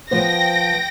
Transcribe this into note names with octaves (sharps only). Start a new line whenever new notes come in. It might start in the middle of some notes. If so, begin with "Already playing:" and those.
F3 B3 C5 G5 A#6